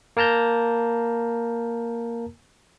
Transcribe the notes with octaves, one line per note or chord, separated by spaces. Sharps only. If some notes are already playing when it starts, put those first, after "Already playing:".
A#3 A#4 A5 A#5 G6